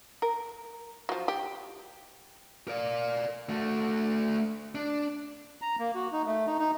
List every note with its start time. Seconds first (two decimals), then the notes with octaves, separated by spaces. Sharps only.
0.22 A#4
1.09 F3 F#3
1.28 G4
2.68 A#4 D5
3.49 A3 F#4
4.75 D4
5.62 A#5
5.79 A#3
5.95 F#4
6.12 D#4
6.26 A3
6.47 D#4
6.59 D#4